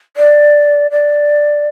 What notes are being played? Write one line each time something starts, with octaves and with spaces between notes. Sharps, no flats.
D5
D5